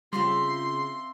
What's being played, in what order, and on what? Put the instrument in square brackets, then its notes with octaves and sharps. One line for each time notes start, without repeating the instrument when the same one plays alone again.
[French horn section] C#3 F4 [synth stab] G3 [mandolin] C4 E5 F5 [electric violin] C6